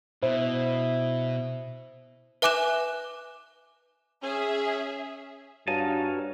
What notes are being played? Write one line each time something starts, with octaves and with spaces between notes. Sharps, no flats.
B2 E4 C5
B4 E5 G#5 D6 F#6 E7
C#4 G#4 E5
G2 D#4 F#4 C#5 F5 G#5 A5